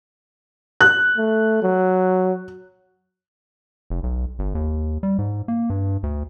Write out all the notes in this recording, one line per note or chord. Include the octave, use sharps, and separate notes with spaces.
F#6
A3
F#3
F1
B1
G1
D#2
G3
G#2
A#3
G2
D2